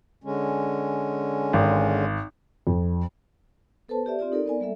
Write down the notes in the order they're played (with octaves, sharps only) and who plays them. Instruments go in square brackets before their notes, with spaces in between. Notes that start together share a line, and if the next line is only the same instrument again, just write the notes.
[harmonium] D3 G#3 C#4
[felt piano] G#1
F2
[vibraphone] B3 A4 B4 C5 A5
G4 D5 E5
C4 F4 G4 D5
D#4 A4 A#4 D5
B3 D5 G#5
G3 A#3 A4 E5